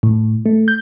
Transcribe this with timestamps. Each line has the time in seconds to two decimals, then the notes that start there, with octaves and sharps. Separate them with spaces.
0.03 A2
0.46 A3
0.68 G6